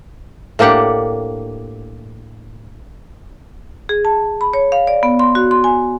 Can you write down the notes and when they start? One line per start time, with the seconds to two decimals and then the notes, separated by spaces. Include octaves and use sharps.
0.59 A2 A#3 D4 G4 F#5
3.89 G#4
4.05 A5
4.41 B5
4.54 C#5
4.72 F5
4.87 D5
5.03 B3
5.19 C6
5.35 F#4
5.51 C6
5.64 G#5